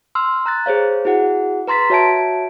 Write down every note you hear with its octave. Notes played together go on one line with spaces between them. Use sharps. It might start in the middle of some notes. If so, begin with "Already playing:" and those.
C6 E6 F6
A#5 F#6 A6
G#4 C5 C#5 F5
E4 F#4 G#4 F#5
B4 A#5 C6 A6 B6
F#4 C#5 E5 A5 G#6 D7